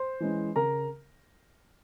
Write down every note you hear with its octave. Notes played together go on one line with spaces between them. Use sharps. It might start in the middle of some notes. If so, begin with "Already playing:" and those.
Already playing: C5 C6
E3 G#3 C#4
C#3 A#4 A#5